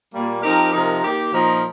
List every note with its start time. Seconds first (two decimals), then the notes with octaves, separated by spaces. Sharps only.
0.12 A#2 G3 A#3
0.42 F3 C4 D#4 G4 A#4
0.73 C3 F3 D#4 A#4
1.03 D#3 A#3 G4
1.33 A#2 F3 D#4 A#4